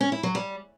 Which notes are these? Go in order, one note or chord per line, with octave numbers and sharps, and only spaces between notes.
C#4
E4
F#3
G3